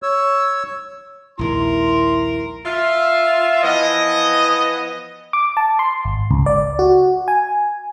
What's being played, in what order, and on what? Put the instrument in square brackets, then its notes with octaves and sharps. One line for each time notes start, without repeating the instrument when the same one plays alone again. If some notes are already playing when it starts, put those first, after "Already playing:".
[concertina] C#5 E6
[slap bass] A#1 D#2 G#3 [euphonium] E4 [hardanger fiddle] A#4 [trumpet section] C6
[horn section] F4 E5
E3 F3 B3 D#5
[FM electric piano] D6
A5
C6
G#1
C#2
D5
F#4
G#5